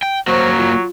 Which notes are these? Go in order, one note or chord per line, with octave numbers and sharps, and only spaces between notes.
G5
F#3 A#3 F#4 C5
F4